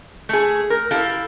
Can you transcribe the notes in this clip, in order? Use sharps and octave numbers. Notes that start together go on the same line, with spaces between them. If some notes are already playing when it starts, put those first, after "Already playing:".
A3 G#4
A#4
E4 G4 A4 F5